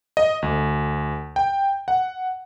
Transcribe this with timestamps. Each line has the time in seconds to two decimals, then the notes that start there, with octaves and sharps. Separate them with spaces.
0.17 D#5
0.42 D2
1.36 G5
1.88 F#5